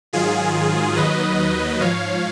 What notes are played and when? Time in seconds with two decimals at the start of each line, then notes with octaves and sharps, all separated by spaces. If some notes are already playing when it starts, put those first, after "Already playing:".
0.13 G#2 D#3 F#3 F4 G#4
0.96 D#2 D#3 F#3 B4 D#5
1.80 G#2 F3 C#5 F5